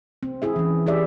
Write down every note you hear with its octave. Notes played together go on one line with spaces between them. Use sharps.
C4
E4 G#4 E5
E3 C#4
E4 G4 G#4 D5 E5